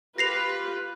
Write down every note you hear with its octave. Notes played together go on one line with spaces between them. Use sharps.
F4 G4 B4 A#6 C7 F7